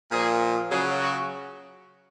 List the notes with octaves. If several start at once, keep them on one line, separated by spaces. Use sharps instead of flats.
A#2 F3 G#4
C#3 F#3 G#4
F#4